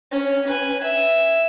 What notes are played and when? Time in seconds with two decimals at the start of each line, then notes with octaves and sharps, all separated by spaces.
0.12 C#4
0.47 B4 G#5
0.84 E5